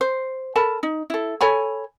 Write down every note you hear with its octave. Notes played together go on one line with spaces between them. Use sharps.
C5
A4 A#4 A5 B5
D#4
E4 A4
A4 C#5 G#5 B5